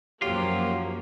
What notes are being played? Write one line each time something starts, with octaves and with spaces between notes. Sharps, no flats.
F#2 F3 F#3 A#3 F4 G4